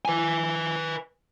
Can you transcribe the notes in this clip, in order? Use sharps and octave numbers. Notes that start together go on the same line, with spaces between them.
B4 G#5